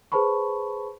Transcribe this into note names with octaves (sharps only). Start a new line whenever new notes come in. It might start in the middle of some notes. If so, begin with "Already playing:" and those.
G#4 B4 C5 A5 B5 C#6